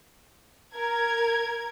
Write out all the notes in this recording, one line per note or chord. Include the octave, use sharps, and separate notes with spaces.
A#4 G#6